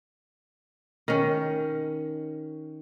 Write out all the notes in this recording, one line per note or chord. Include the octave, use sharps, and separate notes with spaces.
D#3 C#4